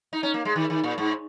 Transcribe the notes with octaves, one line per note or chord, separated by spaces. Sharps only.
D#4
C#4
A#3
G#3
D#3
D#3
A#2
G#2